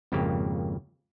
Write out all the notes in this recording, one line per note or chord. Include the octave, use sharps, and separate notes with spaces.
G#1 F2 C#3 A#3 G4